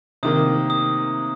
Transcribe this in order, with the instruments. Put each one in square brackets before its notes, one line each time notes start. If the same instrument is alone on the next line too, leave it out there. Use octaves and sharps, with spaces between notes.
[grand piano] C3 D#3 A#3 [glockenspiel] D#6
[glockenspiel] D#6